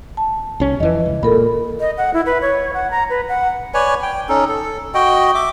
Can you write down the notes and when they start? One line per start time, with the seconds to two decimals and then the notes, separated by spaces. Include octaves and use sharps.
0.17 A5
0.60 C2 C#4
0.80 F2 E3 B4 D#5
1.06 C#2
1.23 A#2 A4 A#4 B5
1.80 D#5
1.98 F#5
2.14 E4
2.26 B4
2.42 C#5
2.74 F#5
2.91 A#5
3.10 B4
3.29 F#5
3.74 B4 C#5 D5 G#5
4.03 G5
4.29 C#4 D#4 A4
4.49 A4
4.94 F#4 D#5 G5
5.35 E5 D6